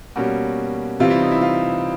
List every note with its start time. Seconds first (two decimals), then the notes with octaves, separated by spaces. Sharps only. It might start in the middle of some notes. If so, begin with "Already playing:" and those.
0.16 B2 G3 A#3 C#4 F#4
1.00 C3 E3 G3 C4 F4
1.10 E4
1.21 D#4
1.31 E4
1.42 F4